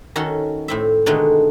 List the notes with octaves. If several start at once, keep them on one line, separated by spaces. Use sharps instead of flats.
D#3 C#4 F#4 A4
A2 C4 E5
B2 D3 D#3 G#3 A3